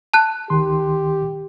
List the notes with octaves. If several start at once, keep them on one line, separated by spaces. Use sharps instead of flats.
A5 F#6
C#2 D#3 G4 C6